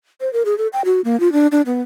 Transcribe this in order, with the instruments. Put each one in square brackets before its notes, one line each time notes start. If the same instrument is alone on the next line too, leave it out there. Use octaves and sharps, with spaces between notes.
[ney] C5
A#4
G#4
A4
G5
F#4
A#3
F4
D4
D4
B3